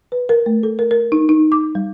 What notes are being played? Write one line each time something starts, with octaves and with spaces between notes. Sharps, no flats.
B4
A#4
A3
A4
A#4
A#4
D#4
D#4
D6
G3